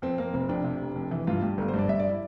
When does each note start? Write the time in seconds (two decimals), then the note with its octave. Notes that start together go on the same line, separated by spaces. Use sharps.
0.02 F2 C4
0.18 F2 A#3
0.34 F1 C4
0.49 F2 D4
0.64 C3
0.81 F1
0.96 F2
1.11 E3
1.27 G2 F4
1.42 G2 G4
1.58 G1 A4
1.68 C5
1.74 G2
1.79 D5
1.88 G2 E5
2.00 D5
2.09 E4